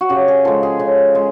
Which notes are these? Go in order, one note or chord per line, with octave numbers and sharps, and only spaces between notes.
F#4
C#3 G4
G#4
F3 G#3 A4
G#4
C#3
G#3